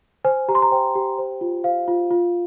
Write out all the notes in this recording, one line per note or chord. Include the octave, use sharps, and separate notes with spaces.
C5 G#5
G4 A#5
C6
A#5
C5 G5
G4
C5
F4
C5 F5
F4
F4